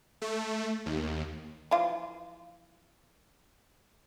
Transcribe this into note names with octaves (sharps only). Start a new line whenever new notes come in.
A3
D#2
E3 F3 F4